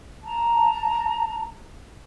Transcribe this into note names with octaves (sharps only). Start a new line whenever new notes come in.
A5 A#5